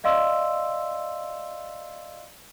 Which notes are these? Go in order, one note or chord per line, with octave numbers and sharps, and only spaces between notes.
D5 D#5 F5 C6 E6